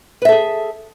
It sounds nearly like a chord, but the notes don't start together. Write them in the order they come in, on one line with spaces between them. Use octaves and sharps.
B4 E5 A4 G#4